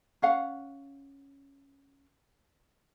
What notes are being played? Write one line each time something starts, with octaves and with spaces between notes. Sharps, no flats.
C#4 F5 F#5